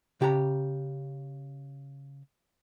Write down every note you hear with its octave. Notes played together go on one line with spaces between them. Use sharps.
C#3 G4 A5 A#5